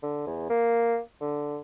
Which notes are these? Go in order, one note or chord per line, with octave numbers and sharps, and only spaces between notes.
D3
E2
A#3
D3